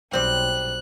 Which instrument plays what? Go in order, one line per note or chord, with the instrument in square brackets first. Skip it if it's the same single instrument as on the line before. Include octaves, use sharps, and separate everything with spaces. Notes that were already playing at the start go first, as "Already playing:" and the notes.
[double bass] B1 [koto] G3 C4 [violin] F#6